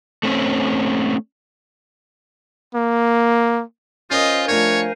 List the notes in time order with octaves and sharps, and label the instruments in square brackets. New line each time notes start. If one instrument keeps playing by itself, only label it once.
[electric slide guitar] A3 C4 C#4
[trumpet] A#3
[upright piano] C#4 A#4 [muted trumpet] F4 [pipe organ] C5 F5 G#5 [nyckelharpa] D#5
[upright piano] F3 A3 D4 [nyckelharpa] A#4 [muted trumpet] C#5